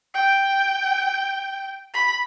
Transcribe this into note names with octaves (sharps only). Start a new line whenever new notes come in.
G5
B5